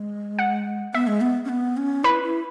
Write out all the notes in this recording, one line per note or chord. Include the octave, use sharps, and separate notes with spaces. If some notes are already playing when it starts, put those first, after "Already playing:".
Already playing: G#3
F#5
B3 E5
G#3
B3
C#4
B3
C#4
E4 B4
E4